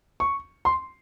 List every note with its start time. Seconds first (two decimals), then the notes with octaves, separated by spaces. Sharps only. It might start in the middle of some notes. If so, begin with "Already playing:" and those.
0.20 C#6
0.65 C6